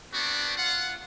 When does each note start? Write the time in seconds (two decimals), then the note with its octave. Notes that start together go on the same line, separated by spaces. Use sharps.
0.13 B3 C4 D4 F#4
0.56 F4 F#5